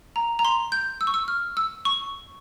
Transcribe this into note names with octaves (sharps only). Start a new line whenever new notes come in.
A#5
A#5
C6
G6
E6
C#6
E6
F6
E6
C#6